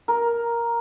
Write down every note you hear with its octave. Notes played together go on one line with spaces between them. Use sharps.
A#4